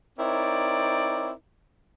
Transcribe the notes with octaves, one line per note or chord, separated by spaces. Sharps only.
C4 D#4 E4 A#4 C#5 D5